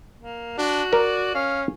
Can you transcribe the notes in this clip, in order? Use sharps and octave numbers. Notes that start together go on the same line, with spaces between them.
A#3
D4 F#4
A#4 D5
C#4 F5